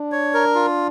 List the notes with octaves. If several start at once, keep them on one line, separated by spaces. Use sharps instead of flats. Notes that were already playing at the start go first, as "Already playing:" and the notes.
Already playing: D4
C#5
A#4
F4